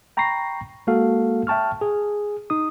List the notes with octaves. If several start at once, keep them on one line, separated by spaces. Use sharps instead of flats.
G5 A#5 B5 C#6 A#6 C7
G#3 A#3 F#4 A4 F5
E5 G5 A5 C#6 F6
G#4
D#4 D#6